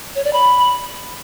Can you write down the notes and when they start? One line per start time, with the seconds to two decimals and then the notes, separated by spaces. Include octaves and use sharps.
0.15 C#5
0.24 D5
0.33 B5